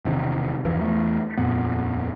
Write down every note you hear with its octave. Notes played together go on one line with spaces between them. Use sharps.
E1 C3 D#3
G1 E2 E3 F3
E2 A3
D#1 F2 A#2 B3